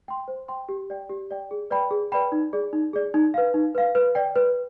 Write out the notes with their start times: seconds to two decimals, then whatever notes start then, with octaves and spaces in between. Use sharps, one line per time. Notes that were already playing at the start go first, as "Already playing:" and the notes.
0.08 G5 C6
0.28 C5
0.48 G5 C6
0.69 G4
0.90 D5 G5
1.10 G4
1.31 D5 G5
1.51 G#4
1.70 B4 D5 G5 B5
1.91 G#4
2.12 B4 D5 G5 B5
2.32 D#4
2.53 G#4 D5
2.73 D#4
2.93 G#4 D5
3.14 D#4
3.34 B4 F5
3.54 D#4
3.75 B4 F5
3.95 B4
4.15 D5 G5
4.36 B4